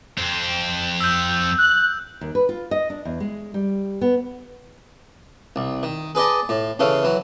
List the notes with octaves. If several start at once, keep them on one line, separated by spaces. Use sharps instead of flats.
F2 C4
E6 G6
F#6
D#2
B4
F4
D#5
D4
E2
G#3
G3
B3
C2
D#3
G#4 B4 D5 D#5 A5
A2
C#3 E3 A4 C#5 F5
E3 F#3